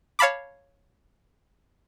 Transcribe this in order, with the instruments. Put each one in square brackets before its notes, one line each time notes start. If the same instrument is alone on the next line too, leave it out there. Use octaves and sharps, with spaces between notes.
[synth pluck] C#5 F5 A5 B5 D6